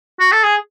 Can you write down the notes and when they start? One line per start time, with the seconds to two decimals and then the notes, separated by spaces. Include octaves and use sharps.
0.19 F#4
0.32 A4
0.43 G#4